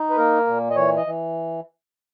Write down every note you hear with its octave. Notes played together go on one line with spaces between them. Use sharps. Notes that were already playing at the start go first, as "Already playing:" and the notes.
Already playing: D#4
B4
A#3 A#4
A#2
D#5
E3 C#5
D#5
E3